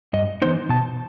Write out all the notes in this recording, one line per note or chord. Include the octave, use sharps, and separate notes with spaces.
G2 D#5
E3 B3 D#4 C5
B2 A5